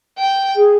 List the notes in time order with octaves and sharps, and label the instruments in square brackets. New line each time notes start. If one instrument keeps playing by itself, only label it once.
[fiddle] G5
[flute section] G#4